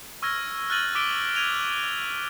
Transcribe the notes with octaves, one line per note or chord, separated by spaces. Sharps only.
C#6 E6 F6 G#6 A#6
F6 F#6 A6 A#6 D#7 F#7
D6 E6 B6 D7 G7
E6
G#6 D#7 F7 G7
F#6